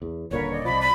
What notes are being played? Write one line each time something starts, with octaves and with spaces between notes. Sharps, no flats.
E2
D#1 A#2 D3 A#4 B4 C#5
D5 D#5
C2 F3 B5
B5